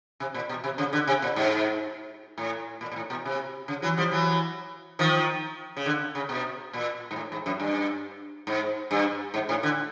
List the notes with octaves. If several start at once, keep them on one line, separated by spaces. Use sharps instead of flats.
C3
A#2
B2
C3
C#3
D3
C3
A#2
G#2
A2
A#2
A#2
A2
B2
C3
C#3
E3 F#3
F3 G3
E3 F#3
D#3 F3
C#3
D3
C#3
B2
A#2
G#2
A2
G#2
F#2
G2
G#2
G2
G#2
A2
D3